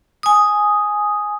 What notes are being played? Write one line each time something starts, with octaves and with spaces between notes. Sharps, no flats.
G#5 D#6